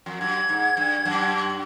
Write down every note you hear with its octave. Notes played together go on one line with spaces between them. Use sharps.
F2
F#2 G#6
G#2
G2
F#2